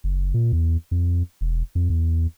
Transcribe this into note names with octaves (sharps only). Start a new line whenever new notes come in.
F#1
A#2
E2
F2
E1
F2
E2